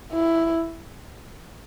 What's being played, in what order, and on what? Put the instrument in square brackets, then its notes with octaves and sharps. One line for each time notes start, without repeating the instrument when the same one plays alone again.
[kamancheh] E4